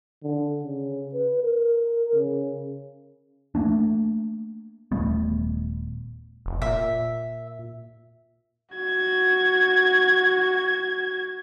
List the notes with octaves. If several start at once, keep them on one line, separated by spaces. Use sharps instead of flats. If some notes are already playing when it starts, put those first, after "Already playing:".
D3
C#3
B4
A#4
C#3
A3 A#3 D4
D#1 G3 A3 B3
F1
A#2 E5
F#4 G#6